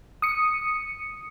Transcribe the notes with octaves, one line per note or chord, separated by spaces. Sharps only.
D#6 C#7